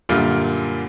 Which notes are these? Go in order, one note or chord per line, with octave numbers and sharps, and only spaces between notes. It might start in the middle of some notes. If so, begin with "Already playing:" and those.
F#2 A#2 D3 G3 A#3 F4